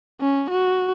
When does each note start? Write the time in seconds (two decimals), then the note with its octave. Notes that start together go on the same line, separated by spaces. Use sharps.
0.21 C#4
0.50 F#4